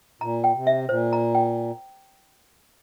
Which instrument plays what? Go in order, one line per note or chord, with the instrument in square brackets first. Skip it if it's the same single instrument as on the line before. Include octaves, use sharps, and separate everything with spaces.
[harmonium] A#2 [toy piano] A#5
[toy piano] G5
[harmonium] C3
[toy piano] E5
[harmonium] A#2 [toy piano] C5
[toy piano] A#5
G5